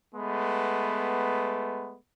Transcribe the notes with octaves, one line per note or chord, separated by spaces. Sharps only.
G#3 A3 B3